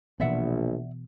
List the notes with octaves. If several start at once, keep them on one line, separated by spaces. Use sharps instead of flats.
A#1 B2 E3 B3 D5 E5 F#5